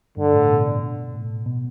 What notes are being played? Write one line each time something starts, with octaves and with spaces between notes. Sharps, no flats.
G2 D3
A2
B2
A2
B2